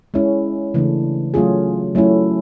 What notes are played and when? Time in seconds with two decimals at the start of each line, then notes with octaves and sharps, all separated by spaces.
0.14 G#3 C#4 E4
0.74 C#3 E3 A3 D4
1.34 F#3 A3 C#4 F4 G#4
1.95 F#3 A3 C#4 E4